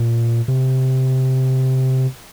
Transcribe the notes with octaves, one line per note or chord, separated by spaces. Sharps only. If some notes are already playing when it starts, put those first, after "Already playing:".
Already playing: A#2
C3